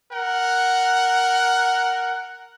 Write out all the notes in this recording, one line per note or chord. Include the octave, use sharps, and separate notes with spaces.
A#4 F#5